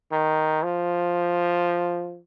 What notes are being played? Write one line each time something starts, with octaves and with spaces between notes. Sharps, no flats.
D#3
F3